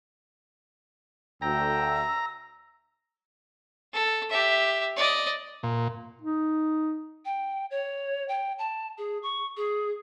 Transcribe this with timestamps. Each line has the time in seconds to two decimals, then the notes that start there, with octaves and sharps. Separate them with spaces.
1.42 D2 G5 A#5 E6
3.93 A4
4.30 G4 E5
4.97 D5 D#5
5.63 A#2
6.22 D#4
7.25 G5
7.71 C#5
8.28 G5
8.59 A5
8.98 G#4
9.23 C#6
9.57 G#4